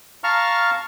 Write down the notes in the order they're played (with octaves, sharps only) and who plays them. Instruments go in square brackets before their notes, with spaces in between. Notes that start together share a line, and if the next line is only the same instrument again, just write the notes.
[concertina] F5 A5 A#5 C#6 F6